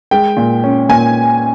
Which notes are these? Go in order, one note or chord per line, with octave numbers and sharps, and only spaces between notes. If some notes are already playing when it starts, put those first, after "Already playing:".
G#3 G5
A#2
C#4
A#2 G#5